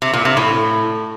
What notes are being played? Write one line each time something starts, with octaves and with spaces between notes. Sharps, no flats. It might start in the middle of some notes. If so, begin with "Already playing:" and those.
C3
A#2
C3
A2